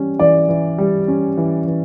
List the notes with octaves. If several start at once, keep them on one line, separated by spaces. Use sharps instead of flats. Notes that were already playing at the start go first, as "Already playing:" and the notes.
Already playing: E3 G3 C#4
E3 D5
E3
G3
C#4
E3
E3